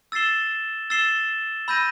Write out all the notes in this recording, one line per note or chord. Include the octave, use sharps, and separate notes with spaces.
E6 A6 C7 E7 G7
E6 A6 C7 E7 G7
B5 E6 G6 A#6 D#7